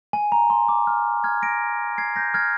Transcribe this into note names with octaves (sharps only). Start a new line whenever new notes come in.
G#5
A#5
C6
D6
F6
F6 G#6
A#6 D7
G#6 C7
G6 A#6
F6 G#6